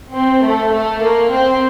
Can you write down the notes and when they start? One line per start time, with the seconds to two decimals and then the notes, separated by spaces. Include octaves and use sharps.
0.12 C4
0.42 A3
0.71 A3
1.01 A#3
1.31 C4